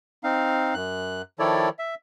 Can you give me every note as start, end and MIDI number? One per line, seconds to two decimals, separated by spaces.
0.24 0.74 60
0.24 0.74 63
0.24 0.74 77
0.74 1.22 42
0.74 1.22 90
1.39 1.69 51
1.39 1.69 53
1.39 1.69 64
1.39 1.69 69
1.39 1.69 73
1.39 1.69 74
1.79 1.95 76